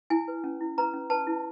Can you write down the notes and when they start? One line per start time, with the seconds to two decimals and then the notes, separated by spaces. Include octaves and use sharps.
0.10 E4 G#5
0.28 B4
0.44 C#4
0.60 E4
0.78 B4 A#5
0.93 C#4
1.10 B4 A5
1.27 E4